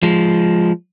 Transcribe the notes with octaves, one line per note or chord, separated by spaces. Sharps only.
F3 G#3